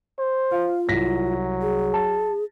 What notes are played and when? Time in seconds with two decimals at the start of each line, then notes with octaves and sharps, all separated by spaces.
0.19 C5
0.51 F4 F5
0.89 C2 F#3 A#6 B6
1.61 G#4
1.94 A5